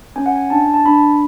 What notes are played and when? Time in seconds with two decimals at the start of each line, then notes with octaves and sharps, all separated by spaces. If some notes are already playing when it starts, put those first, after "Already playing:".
0.16 C#4 G#5
0.26 F#5
0.36 G#5
0.50 D4 A5
0.74 A5
0.86 D4 B5